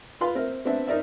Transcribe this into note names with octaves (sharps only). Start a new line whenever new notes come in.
F4 B4 F5 C6
C4 A#4 E5
B3 C4 D4 E5
C4 D#4 A#4 D5 E5